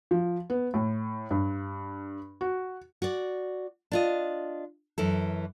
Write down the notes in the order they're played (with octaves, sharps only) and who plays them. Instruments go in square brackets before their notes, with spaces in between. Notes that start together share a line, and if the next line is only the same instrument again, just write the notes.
[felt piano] F3
B3
A2
G2
F#4
[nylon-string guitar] F#4 D5
D4 F4 D#5
F#2 E3 A4